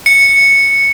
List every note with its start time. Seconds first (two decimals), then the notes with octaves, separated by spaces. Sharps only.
0.06 C#7